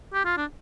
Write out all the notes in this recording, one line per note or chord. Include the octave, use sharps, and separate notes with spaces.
G4
F4
D4